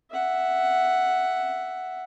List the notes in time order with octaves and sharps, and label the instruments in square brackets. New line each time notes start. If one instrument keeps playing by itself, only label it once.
[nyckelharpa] E5 F#5